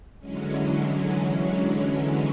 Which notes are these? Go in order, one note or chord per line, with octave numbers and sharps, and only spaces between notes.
D3 E3 F#3 G#3 C#4